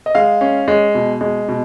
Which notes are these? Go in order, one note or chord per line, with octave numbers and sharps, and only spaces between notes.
D#5
G#3 F5
C#4
G#3
B2
G#3
B2